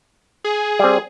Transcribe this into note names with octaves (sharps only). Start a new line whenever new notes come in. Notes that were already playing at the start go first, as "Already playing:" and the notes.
G#4
G3 C4